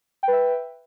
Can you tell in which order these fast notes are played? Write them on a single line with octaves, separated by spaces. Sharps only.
G5 B4 E5